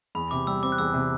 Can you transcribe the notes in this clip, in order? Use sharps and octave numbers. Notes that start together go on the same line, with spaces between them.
E2 B5
C3 D6
G3 E6
C4 D6
F#6
E2 E6
C3